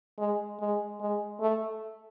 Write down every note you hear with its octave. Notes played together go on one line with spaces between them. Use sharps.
G#3
G#3
G#3
A3